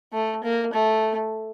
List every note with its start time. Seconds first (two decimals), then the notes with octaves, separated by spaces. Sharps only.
0.13 A3
0.44 A#3
0.73 A3